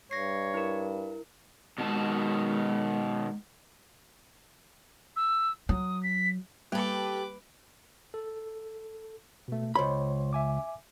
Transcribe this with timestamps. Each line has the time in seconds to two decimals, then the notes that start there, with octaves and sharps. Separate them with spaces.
0.11 G2 C#5 A#6 C7
0.54 E4 A#4
1.78 B2 D#3 G#3 A5
5.16 E6
5.69 F#3 D#6
6.03 B6
6.72 G3 A#3 G4 A4 B4 D6
8.14 A4
9.48 B2 A3
9.75 C#2 C5 C#5 B5 C6
10.33 E5 G#5 D6